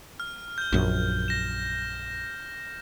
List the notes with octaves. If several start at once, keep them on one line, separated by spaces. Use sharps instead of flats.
F6
G6 G7
A#1 F#2
A#6 E7